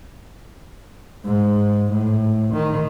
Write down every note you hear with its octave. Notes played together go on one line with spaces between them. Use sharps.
G#2
A2
D#3